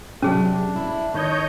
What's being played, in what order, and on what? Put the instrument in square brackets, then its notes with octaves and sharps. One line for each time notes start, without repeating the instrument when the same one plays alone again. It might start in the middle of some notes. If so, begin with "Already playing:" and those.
[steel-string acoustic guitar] C3 F#3 [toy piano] C#4 G#4 [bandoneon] D4
[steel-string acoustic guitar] E4
[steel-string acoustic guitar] D#3 [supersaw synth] C#5 D#5 G6